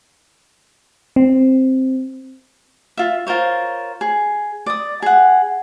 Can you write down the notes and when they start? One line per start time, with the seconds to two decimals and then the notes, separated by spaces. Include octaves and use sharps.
1.16 C4
2.97 F4 E5
3.27 F4 A#4 C5 C#5
4.01 G#4
4.66 D5 D#6
5.02 G#4 F#5